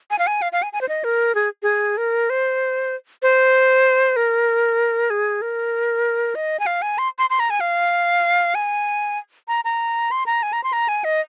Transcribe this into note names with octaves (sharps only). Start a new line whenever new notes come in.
G#5
F5
G#5
F5
F5
G#5
G#5
C5
D#5
A#4
G#4
G#4
A#4
C5
C5
A#4
G#4
A#4
D#5
G#5
F5
G#5
C6
C6
C6
A#5
G#5
F5
G#5
A#5
A#5
C6
A#5
G#5
A#5
C6
A#5
G#5
D#5